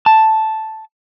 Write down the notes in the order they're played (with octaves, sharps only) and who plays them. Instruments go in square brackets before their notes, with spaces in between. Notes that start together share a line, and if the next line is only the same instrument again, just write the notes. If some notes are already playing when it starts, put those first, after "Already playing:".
[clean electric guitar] A5